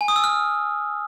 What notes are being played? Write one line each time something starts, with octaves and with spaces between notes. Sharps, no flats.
G#5
D#6
E6
F6